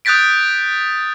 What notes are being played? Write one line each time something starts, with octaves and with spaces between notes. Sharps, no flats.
D#6 F#6 G6 A6 B6 D7